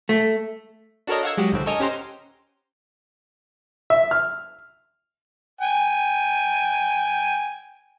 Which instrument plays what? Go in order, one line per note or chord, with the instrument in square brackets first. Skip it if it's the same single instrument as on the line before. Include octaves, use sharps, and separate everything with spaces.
[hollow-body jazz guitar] A3
[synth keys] D4 F#4 A4 A#4 C#5 D#5
F5 F#5 C#6 E6 G#6
F#3 G#3 F#4 G4
C#2 A2 D3 C4
A4 A#4 C#5 D#5 G#5 A#5
C#4 G4 C5 F#5 A#5 C6
[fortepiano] E5
F6
[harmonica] G5 G#5